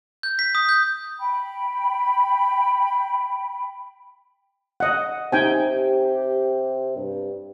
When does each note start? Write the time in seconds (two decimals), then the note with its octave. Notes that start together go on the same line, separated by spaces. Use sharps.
0.23 G6
0.39 B6
0.55 D#6
0.69 G6
1.20 G5 B5
4.80 D#5 F#5
5.32 C3 D#4 G4 G5 G#5
6.96 G2